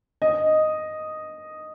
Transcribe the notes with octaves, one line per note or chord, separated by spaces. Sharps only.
D#5